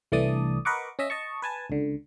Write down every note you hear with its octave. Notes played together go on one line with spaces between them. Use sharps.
C2 E3 A3 D4 D5 D#6
A#4 B4 D#5 F#5 C#6 D6
C#4 D#5 E5
D#5 A5 C#6
B4 G#5 A5
C#2 D3